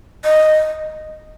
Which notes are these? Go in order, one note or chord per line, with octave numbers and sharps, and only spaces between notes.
D#5